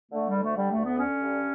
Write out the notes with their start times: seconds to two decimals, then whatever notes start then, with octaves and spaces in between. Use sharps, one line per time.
0.12 D3 A3
0.28 G3
0.35 D2
0.42 A3
0.56 D3 G3
0.71 A3
0.78 D2
0.85 B3
0.99 D3 C#4
1.22 G2